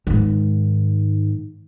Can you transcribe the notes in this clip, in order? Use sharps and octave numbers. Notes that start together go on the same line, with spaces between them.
G#2 D#3